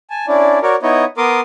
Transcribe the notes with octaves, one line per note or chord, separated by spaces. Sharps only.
G#5 A5
C#4 D4 E4 D5
F#4 A#4 C#5 D5
B3 D#4 E4 C#5 D#5
B3 A#4 C6 D6 D#6